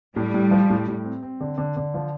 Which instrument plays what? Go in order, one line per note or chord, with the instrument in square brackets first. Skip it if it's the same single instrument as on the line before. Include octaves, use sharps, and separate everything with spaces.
[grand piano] A2 [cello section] G3
[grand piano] A2
F3
A2
A2
C4
C4
D3
D3
D3
F3